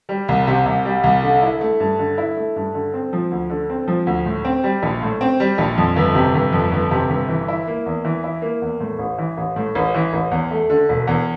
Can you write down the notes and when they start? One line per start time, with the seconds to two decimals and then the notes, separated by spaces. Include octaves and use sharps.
0.09 G3
0.28 C2
0.47 C3
0.66 C2
0.85 G3
1.04 C2
1.23 D3
1.42 E4
1.61 A3
1.80 G2
1.99 D3
2.18 E4
2.37 A3
2.56 G2
2.74 D3
2.94 C4
3.13 F3
3.31 D2
3.50 D3
3.70 C4
3.88 F3
4.07 D2
4.26 A2
4.45 C4
4.64 G3
4.83 A#1
5.02 A2
5.21 C4
5.40 G3
5.58 A#1
5.77 F2
5.96 G1
6.15 C3
6.34 G1
6.53 F2
6.72 G1
6.91 C3
7.10 G1
7.29 E3
7.48 E4
7.67 A#3
7.86 E2
8.05 E3
8.24 E4
8.42 A#3
8.62 E2
8.80 A2
8.99 A1
9.18 E3
9.37 A1
9.56 A2
9.75 A1
9.95 E3
10.13 A1
10.31 E2
10.51 A3
10.70 D3
10.89 E1
11.07 E2